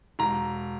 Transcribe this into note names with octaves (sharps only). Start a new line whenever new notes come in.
E1 A#5